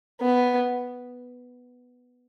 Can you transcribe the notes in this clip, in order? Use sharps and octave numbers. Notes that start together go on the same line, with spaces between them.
B3